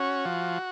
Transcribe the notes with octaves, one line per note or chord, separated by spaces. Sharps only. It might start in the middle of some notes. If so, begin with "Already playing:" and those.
Already playing: C#4 F#4
F3